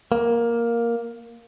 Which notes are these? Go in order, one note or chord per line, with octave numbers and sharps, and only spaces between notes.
A#3